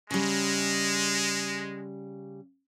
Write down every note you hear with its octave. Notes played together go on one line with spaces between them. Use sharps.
C#3 G3 G#3